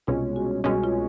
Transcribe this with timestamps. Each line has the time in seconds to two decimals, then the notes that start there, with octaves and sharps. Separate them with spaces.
0.07 C2 B2 G#3 C#4 F4
0.36 F#4
0.64 C2 B2 G#3 C#4 F#4
0.84 F4